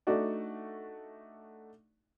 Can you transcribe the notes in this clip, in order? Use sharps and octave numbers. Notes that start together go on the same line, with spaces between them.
A3 D4 D#4 F#4 D5